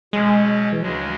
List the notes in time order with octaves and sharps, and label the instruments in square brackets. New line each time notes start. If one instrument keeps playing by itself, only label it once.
[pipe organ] B2 F#3 C#4 [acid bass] G#3
[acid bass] E3
[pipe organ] D2 C#3 G#3 D4 [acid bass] F#3